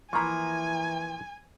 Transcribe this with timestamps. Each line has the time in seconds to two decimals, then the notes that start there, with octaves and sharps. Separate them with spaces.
0.13 E3 F3 A#3 E4 G#5 A#5 B5 C#6